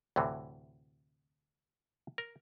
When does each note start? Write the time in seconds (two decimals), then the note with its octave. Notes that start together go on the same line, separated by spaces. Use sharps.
0.16 D2 A2 C3 E3
2.18 A#4